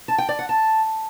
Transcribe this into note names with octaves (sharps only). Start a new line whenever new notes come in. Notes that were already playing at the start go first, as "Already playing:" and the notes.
A5
G5
D5
F#5
A5